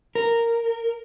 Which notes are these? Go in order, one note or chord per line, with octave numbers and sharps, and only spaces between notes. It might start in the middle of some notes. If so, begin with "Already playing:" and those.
A#4